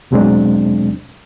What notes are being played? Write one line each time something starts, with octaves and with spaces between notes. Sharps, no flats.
E2 B2 F#3 G#3 C4 D4